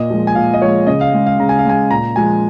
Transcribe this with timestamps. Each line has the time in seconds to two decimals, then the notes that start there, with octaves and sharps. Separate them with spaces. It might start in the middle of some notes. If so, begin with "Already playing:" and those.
Already playing: A#2 D#5
0.10 F3 G#3
0.27 G#5
0.35 A#2 F5
0.54 D#5
0.61 F3 G#3 C#5
0.87 C#3 D#5
1.01 F5
1.13 G#3
1.27 F5
1.39 C#3 A#5
1.49 G#5
1.59 F5
1.65 G#3 G#5
1.91 A#2 A#5
2.16 F3 G#3 G#5